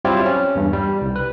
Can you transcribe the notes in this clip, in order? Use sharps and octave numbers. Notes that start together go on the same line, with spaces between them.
F#3 G3 C4 E4 F4 G4
C#4
E2 G2
G3
C2
B4